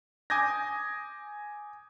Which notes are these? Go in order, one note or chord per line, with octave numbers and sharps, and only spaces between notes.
G#5 D6 D#6 G6 G#6 A#6